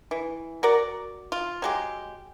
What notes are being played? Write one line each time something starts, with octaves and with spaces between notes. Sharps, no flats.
E3
F#4 A#4 D5
F4
F#3 G#3 G4